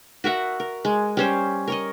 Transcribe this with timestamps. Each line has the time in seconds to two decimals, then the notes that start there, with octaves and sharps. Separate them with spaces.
0.24 F#4 A#4 E5 F#5
0.60 A#4
0.85 G#3
1.17 G3 C#4 C5
1.68 A#4 C#5 D#5